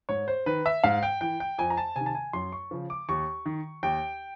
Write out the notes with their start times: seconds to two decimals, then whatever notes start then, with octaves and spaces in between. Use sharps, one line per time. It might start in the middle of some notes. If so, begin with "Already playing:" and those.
0.09 G#2 C#5
0.28 C5
0.46 D#3 B4
0.66 E5
0.84 G#2 F5
1.03 G5
1.21 E3 G5
1.40 G5
1.58 F2 G#5
1.70 A#5
1.77 A5
1.96 C3 D#3 G#5
2.06 A5
2.15 G#5
2.33 F#2 C6
2.52 C#6
2.71 C#3 F3
2.90 D6
3.09 D#2 C#6
3.46 D#3
3.83 D#2 G5